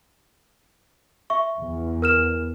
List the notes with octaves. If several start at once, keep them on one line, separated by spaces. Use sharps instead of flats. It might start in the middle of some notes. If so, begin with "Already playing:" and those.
E5 C#6
E2
A#4 F6 E7